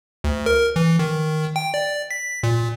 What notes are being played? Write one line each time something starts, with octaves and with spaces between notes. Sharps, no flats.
D2
A#4
E3
D#3
G5
D5
B6
A#2